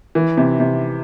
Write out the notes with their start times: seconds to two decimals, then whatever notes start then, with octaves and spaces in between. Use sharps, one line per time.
0.15 E3
0.37 C3
0.60 C3